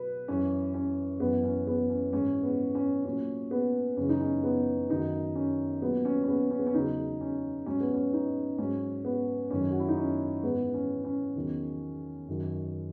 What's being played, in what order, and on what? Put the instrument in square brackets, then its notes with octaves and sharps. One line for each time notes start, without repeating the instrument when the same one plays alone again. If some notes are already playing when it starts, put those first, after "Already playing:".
Already playing: [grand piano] B2 F#3 B4
F#2 E3 C#4
C#4
F#2 E3 B3
C#4
B3
C#4
G#2 E3 C#4
B3
C#4
A#2 F#3 C#4
B3
F#2 C#3 E3 C#4
D#4
C#4
B3
F#2 D#3 F#3 D#4
C#4
A#2 F#3 B3
C#4
C#4
B3
C#4
B3
C#4
E2 C#3 F#3 D#4
C#4
G#2 F#3 C#4
B3
C#4
D#4
G#2 F#3 C#4
B3
F#2 D#3 F#3 C#4
F#4
E4
D#4
C#4
G#2 E3 B3
C#4
C#4
E2 D#3 F#3
F#2 D#3 F#3